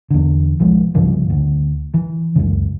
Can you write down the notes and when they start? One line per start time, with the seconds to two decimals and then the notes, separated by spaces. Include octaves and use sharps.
0.11 E2 D3
0.60 B1 F3 G#3
0.95 C2 G2 C#3 F3
1.30 D2
1.94 E3
2.36 C#2 F#2 C#3